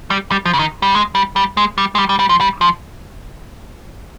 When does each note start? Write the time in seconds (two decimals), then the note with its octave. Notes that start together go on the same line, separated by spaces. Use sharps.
0.10 G3
0.31 G3
0.46 F3
0.53 C#3
0.59 D#3
0.82 G3
0.95 G#3
1.15 G3
1.36 G3
1.57 G#3
1.78 G3
1.95 G#3
1.98 G3
2.09 G3
2.19 G3
2.29 F3
2.41 G3
2.61 F3